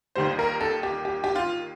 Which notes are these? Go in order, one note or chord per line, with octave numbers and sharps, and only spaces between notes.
D#2 D#3 G3 C5
A#4
A4
G4
G4
G4
F4